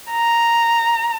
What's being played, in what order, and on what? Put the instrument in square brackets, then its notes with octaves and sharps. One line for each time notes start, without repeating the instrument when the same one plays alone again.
[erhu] A#5